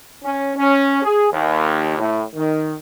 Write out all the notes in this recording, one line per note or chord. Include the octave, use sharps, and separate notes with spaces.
C#4
C#4
G#4
D#2
A2
D#3